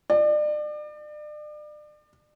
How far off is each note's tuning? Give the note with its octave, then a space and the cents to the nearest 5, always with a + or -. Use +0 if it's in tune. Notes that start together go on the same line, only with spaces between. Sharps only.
D5 +35